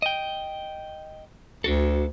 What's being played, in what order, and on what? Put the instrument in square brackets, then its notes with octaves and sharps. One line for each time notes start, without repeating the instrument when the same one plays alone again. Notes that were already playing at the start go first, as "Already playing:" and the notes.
[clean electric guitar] D#5 G5
[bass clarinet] D2 [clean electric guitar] D4 F#4 A4